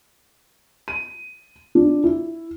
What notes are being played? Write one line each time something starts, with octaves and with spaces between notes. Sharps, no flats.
D#7
D4
E4